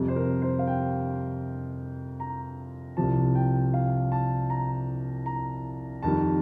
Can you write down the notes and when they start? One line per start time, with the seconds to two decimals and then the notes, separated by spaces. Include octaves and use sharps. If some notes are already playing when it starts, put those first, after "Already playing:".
Already playing: F2 C3 G3
0.08 C5
0.16 A#4
0.42 C5
0.59 F5
0.67 G5
2.20 A#5
2.97 C2 C3 F3 A5
3.35 G5
3.74 F5
4.12 A5
4.50 A#5
5.26 A#5
6.03 F2 D#3 G3 A5